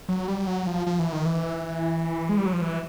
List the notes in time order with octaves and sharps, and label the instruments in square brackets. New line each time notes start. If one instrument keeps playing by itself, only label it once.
[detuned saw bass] F#3
G3
F#3
F3
F3
E3
D#3
E3
G#3
G3
F#3
F3
E3